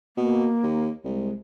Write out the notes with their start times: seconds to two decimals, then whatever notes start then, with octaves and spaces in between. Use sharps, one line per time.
0.17 B2 A#3
0.63 D#2
1.04 C2 G#3